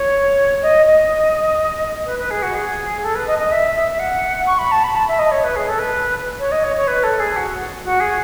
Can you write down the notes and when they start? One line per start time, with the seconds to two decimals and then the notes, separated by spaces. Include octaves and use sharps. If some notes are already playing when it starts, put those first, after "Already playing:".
Already playing: C#5
0.62 D#5
0.85 D#5
2.05 B4
2.18 B4
2.30 G#4
2.42 F#4
2.54 G#4
3.02 A4
3.15 B4
3.27 D#5
3.38 D#5
3.51 E5
3.75 E5
3.99 F#5
4.46 C#6
4.58 B5
4.71 A5
4.83 B5
4.95 A5
5.07 E5
5.18 D#5
5.31 C#5
5.43 B4
5.55 G#4
5.68 A4
5.78 B4
6.39 C#5
6.51 D#5
6.63 C#5
6.76 C#5
6.87 B4
7.03 A4
7.19 G#4
7.36 F#4
7.84 F#4
8.00 G#4